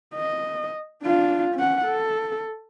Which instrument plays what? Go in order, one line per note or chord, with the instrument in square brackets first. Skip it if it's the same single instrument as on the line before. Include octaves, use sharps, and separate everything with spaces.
[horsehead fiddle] D#5
D4 F4
C#4 F#5
A4